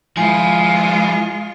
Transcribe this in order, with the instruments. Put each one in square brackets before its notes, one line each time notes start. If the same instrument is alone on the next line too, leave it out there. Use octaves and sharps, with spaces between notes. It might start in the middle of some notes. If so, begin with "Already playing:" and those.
[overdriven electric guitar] F3 E4 [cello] G#3 F4 [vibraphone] G#5